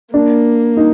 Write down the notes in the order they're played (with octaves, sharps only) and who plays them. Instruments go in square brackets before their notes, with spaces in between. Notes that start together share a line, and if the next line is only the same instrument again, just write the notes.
[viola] A#3 [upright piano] D4
[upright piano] D#4